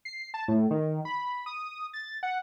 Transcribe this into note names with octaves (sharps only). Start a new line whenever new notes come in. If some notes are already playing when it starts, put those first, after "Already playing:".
C7
A5
A2
D#3
B5
D#6
A6
F#5